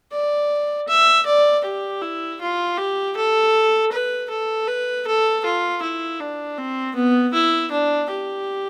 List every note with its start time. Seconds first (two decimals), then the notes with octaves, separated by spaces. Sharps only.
0.12 D5
0.88 E5
1.26 D5
1.64 G4
2.02 E4
2.40 F4
2.77 G4
3.16 A4
3.92 B4
4.30 A4
4.67 B4
5.06 A4
5.45 F4
5.83 E4
6.20 D4
6.58 C4
6.95 B3
7.33 E4
7.71 D4
8.10 G4